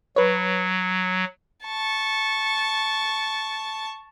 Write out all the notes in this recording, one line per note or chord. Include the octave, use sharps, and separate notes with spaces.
F#3 B4 C#5
A5 C#6